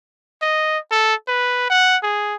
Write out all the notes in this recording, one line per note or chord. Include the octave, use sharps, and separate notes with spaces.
D#5
A4
B4
F#5
G#4